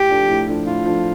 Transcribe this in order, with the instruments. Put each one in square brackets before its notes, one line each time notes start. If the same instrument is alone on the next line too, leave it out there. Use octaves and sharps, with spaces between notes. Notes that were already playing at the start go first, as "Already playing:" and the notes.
Already playing: [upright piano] A2 [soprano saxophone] G4
[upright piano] F3 D4 A4
A2
F3 D4 A4
[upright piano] A2 [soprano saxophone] F4
[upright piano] F3 D4 A4